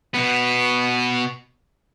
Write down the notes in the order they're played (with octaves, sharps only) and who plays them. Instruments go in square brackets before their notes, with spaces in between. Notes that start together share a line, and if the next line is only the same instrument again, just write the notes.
[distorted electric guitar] B2 B3